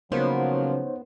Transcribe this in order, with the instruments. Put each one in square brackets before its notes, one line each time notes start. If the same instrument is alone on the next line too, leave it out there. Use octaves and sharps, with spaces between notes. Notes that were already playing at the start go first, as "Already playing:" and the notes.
[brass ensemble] C#3 F3 F#3 [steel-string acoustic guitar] A#3 [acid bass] B3 [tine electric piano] D#4 C5 C#5